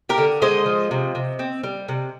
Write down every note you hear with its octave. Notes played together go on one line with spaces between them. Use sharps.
G4 A#4
D3
G#3 C5 D#5
F3
C3
C3
C4
G3
C3